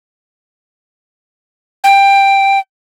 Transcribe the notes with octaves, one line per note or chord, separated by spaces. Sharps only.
G5